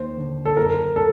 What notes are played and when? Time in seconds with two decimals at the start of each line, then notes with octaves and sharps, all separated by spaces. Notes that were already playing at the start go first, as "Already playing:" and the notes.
Already playing: D#2 C5
0.17 D3
0.45 A4
0.57 F#1 A#4
0.96 A4